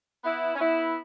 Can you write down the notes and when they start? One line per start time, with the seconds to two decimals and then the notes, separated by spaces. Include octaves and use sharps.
0.24 B3 E4
0.55 C#4
0.59 B3 E4